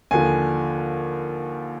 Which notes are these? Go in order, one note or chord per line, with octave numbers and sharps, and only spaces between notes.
D#2 D3 F3 G#5